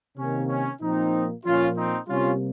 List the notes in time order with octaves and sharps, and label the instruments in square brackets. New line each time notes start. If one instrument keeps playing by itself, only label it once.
[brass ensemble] C3 D#3 A#3 C#4
C#4
A#2 F3 A#3 C4 D#4
A#2 F3 A#3 C#4 F4
C4 D#4
C3 G3 A#3 C#4 F4